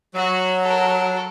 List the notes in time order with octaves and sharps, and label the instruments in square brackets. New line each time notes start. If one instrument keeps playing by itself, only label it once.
[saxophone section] F#3 [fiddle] F#4
[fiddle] A4 A#4